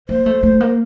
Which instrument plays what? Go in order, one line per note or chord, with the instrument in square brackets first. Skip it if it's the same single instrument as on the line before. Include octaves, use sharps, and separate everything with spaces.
[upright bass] A#3 [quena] C5
[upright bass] A3
A3
A#3